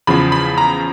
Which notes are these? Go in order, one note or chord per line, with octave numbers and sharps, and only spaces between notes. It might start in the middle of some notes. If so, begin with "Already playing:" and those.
E2 C#3 F3 B5
B5
A#5